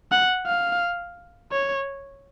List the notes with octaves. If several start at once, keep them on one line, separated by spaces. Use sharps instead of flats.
F#5
F5
C#5